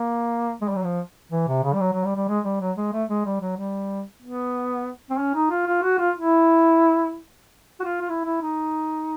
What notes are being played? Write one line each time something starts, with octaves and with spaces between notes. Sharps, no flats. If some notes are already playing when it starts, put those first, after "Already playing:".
Already playing: A#3
G#3
G3
F#3
F3
E3
C3
C#3
G3
F#3
F#3
G3
G3
G#3
G3
F#3
G#3
A3
G#3
G3
F#3
G3
B3
C4
C#4
D#4
F4
F4
F#4
F4
E4
F#4
F4
F4
E4
E4
D#4